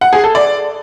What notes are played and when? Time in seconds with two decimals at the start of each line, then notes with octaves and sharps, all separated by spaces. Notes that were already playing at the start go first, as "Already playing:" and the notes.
0.01 F#5
0.13 G#4
0.24 A4
0.35 D5